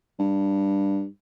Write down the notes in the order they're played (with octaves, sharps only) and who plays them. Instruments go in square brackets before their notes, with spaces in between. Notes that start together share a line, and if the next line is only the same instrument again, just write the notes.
[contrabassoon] G2